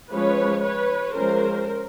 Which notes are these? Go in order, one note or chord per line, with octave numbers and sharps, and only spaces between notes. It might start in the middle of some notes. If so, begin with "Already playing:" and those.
F3 G#3 C#4 B4 C#5
B4 C#5
F3 G#3 C#4 A#4 C5